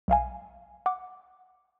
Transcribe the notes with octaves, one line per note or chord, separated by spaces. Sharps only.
B1 E5 F5 G#5
F#5 D6